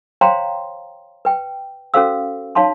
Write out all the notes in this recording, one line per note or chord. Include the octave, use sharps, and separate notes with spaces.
C5 C#5 F5 G5 A#5 C6
B4 G5
C#4 F#4 A4 C5 F5 E6
D#4 C#5 F5 A5 C6